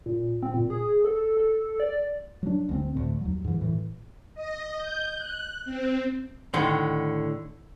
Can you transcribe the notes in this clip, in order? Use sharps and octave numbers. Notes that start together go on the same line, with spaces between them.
A#2
C4
A#2
G#4
A4
A4
D5
F#3 D4
D2 G#3 C4
D2 A2
D#2 F#3
G#2 E3
A2 E3
D#5
G6
F#6
C4
A2 D3 D#3 C6